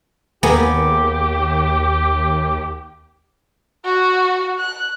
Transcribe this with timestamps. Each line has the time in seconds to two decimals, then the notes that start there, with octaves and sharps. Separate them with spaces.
0.43 D#2 A#3 B3 G4 G#4
3.85 F#4
4.59 F#6